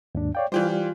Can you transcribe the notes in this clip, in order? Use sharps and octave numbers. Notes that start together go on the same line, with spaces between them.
D#2 G#2 D4
C#5 D5 F5 G5
E3 G3 F4 G4 C5 D5
F4